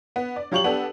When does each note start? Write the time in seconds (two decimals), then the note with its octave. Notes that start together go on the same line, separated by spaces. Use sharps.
0.16 B3
0.36 D5
0.52 F#3 F4 G4 C#6 F7 F#7
0.64 B3 D4 G4 A4